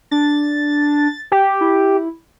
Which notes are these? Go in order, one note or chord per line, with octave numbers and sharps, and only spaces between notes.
D4 A6
G4
E4